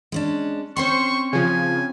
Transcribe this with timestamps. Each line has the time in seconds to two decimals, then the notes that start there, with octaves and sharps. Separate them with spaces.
0.12 G#3 C#4 D4
0.77 C4 C#4 C5 C#5 C6 C#6
1.33 C#3 F3 G#5